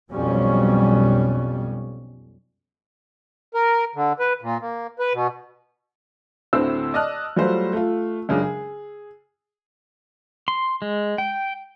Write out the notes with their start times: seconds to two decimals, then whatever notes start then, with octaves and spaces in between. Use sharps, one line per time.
0.12 B1 F2 B2 G3 C#4
3.54 A#4
3.95 D3
4.19 B4
4.42 A#2
4.61 A#3
4.99 B4
5.13 B2
6.53 D2 A2 D3 C4 C5 E6
6.94 D5 D#5 A5 D#6 F6 F#6
7.36 F#3 G3 A3 F4 C5
7.73 A3 F4
8.29 F#2 C#3 G#3 D4
8.42 G#4
10.48 C6
10.82 G#3
11.18 G5